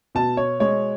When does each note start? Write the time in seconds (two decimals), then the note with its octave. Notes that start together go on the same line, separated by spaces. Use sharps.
0.15 B2 A5
0.37 C#5
0.60 G#3 C#5